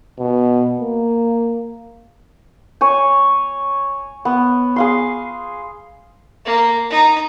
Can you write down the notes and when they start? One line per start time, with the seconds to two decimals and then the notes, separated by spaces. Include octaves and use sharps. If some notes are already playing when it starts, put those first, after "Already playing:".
0.19 B2
0.80 A#3
2.81 C#5 G#5
4.25 B3
4.76 G#4 F5 C6
6.45 A#3
6.90 D#4 A#5